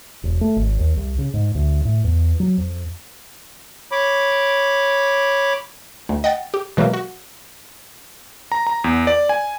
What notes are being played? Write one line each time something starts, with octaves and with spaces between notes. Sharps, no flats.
E1
A3
G#1
D#2
C2
C#3
G#2
D2
A2
E2
F#3
F2
C#5 B5 D6
D2
D#5 F#5 G5 A6
G4
B2 E3 F#3 G#3 A#3
F#4
A#5
A#5
E2
D5
G#5